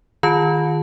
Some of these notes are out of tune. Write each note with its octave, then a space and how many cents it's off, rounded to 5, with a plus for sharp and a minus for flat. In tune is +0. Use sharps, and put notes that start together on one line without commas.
D#3 -5 F4 +0 A5 +0